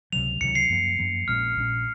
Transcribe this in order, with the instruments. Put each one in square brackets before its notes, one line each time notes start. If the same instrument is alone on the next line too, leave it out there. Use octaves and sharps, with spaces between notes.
[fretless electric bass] C#2 C3 D#3 F#3 [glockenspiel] F7
[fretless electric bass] C#2 C3 D#3 F#3 [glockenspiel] C#7
[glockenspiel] C7
[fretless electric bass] F#2 F3 A#3
F#2 F3 A#3
[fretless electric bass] A#1 A#2 G#3 C#4 [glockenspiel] F6
[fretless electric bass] A#1 A#2 G#3 C#4